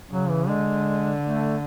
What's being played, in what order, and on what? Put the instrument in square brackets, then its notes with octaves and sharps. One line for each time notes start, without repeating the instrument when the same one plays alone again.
[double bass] C#3 [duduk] F#3
[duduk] E3
[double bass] D3 [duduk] G#3
[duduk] A3